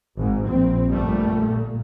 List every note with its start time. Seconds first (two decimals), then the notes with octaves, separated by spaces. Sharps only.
0.16 G#1 G#2
0.48 A#1 C4
0.89 G1 A#2 G3 A3
1.49 A#2